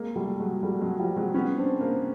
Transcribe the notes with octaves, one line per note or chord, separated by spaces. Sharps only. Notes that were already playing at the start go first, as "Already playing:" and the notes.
Already playing: G#3 A#3
G3 A3
F#3 G#3
G3 A3
F#3 G#3
F3 G3
F#3 G#3
B3 C#4
C4 D4
A#3 C4